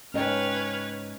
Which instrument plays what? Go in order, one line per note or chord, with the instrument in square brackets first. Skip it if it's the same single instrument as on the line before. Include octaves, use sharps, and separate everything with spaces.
[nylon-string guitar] G#2 D#5 G5 [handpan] C#4 [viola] B4 C#5 [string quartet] F6